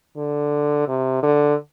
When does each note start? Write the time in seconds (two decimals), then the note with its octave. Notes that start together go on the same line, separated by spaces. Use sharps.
0.17 D3
0.88 C3
1.23 D3